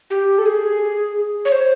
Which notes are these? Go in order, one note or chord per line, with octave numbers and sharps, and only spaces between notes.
G4
A4
G#4
C#5
C5